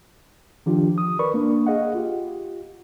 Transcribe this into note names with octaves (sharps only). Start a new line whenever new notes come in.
D#3 F3 D4 F4 G4
D#6
A#4 B4 D5 B5 C#6
A#3 D4
G#4 D#5 F5 F#5
F4 G4